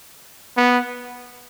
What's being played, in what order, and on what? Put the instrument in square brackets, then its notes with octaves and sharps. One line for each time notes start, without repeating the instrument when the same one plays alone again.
[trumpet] B3